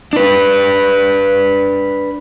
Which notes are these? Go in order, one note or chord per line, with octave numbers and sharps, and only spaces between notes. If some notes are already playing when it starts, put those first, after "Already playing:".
D4 B4